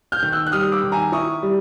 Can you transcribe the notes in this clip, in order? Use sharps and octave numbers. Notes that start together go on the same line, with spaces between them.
F6 G6
D#3
E6 F#6
F#6
G3 D#6 F6
D6 E6
D#3
G#5 A#5
E4 C#6 D#6
G3